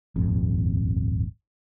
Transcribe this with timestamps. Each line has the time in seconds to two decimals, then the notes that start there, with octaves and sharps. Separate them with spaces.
0.16 D#1 G#1 F2